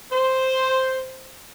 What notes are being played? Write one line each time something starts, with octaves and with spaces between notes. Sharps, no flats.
C5